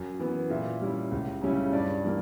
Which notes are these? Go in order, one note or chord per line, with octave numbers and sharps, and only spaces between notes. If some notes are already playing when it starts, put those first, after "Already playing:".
Already playing: F#2
E3 B3
A#2 E5
G3 C#4 E4
C#2
C#3 G3 C#4 E4
G2 D5
E3 G3 A#3